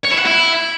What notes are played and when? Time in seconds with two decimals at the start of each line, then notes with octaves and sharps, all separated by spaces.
0.05 C#5
0.12 E4
0.19 F#5
0.26 E4